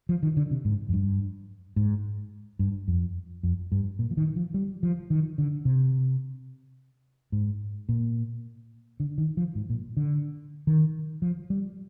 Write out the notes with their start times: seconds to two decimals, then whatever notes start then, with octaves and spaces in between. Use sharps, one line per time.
0.09 F3
0.23 D#3
0.37 D3
0.51 C3
0.65 G#2
0.89 F2
0.93 G2
1.76 G#2
2.59 G2
2.88 F2
3.43 F2
3.72 G2
3.99 A#2
4.11 F3
4.17 D#3
4.36 F3
4.54 G3
4.83 F3
5.10 D#3
5.38 D3
5.65 C3
7.32 G#2
7.89 A#2
9.00 D3
9.18 D#3
9.37 F3
9.55 G#2
9.70 A#2
9.97 D3
10.67 D#3
11.22 F3
11.50 G3